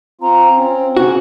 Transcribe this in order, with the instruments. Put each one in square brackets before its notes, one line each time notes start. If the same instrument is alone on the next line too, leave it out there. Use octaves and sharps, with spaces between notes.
[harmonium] C4 F4 [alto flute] A#5
[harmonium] C4 [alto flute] C#4
[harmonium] C#3 [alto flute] C#4 [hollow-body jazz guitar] F#4